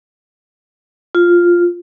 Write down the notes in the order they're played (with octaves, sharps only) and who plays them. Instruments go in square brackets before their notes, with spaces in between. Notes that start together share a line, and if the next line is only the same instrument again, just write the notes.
[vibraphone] F4